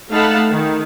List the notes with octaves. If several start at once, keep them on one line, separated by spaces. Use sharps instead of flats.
A3 D#4 F5 F#5 A5 B5
D#3